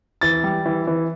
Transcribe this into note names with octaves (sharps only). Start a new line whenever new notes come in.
E3 A6
G3
E3
E3